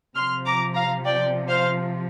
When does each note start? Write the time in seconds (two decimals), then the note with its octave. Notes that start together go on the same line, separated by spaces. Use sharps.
0.16 C3 F3 C6 F6
0.46 A#5 D6
0.75 F5 A#5
1.05 D5 G5
1.48 C5 F5